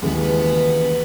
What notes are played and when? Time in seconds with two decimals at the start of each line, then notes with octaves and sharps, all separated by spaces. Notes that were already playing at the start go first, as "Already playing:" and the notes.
0.02 D#2 C#3 E3 G#3 B3
0.18 B3
0.32 B3